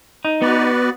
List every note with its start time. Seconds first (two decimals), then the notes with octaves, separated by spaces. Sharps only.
0.25 D#4
0.42 B3 F#4 B4 D5